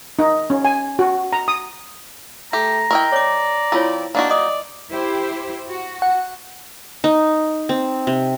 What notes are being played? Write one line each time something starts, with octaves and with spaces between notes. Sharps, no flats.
D#4
C#4
G#5
F#4
A#5
D#6
A3 G4 A#5
E4 A#4 D#5 G5 C#6
C#5 D5 D6
F3 C4 E4 F4 C#5
A#3 D4 D#4 F#4
D5 D#5 D6 D#6
E4 G4 C5
F#4
F#5
D#4
C4
C3